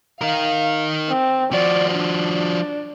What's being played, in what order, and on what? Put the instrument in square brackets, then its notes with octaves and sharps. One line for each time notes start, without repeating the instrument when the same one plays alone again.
[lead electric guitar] D#4 A#4 [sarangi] F5
[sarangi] C4
[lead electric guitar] F3 F#4 [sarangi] D5
[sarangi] D4